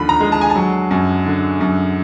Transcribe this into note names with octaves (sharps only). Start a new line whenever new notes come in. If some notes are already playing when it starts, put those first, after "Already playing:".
Already playing: D#2 D3 F3 B5
A#5
G#3
A5
G#5
A5
F#3
F#2
D3
F#2